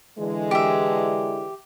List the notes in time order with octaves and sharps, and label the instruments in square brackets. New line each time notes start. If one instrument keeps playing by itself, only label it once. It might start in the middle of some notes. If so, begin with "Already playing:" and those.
[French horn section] D3 E3 G#3
[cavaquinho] G4 E5